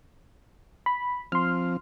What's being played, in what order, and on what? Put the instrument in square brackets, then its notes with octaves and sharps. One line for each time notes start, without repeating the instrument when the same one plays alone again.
[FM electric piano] B5
[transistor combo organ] F3 C4 [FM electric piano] C6 F6